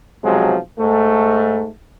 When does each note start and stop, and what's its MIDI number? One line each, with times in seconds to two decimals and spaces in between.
0.24 0.57 35
0.24 0.57 48
0.24 0.57 53
0.24 0.57 54
0.24 0.57 56
0.78 1.68 44
0.78 1.68 57